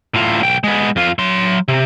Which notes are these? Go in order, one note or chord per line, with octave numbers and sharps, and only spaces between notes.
A2 F4
B1 G5
G#3 B3
F2 F4
F#3 C6
C3